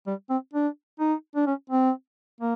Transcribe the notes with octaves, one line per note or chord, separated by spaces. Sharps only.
G3
C4
D4
D#4
D4
C#4
C4
A#3